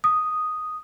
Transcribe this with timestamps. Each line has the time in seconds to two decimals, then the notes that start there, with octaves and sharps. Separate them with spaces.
0.04 D#6